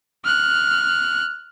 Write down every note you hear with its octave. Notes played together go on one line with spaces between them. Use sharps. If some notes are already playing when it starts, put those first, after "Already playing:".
F6 F#6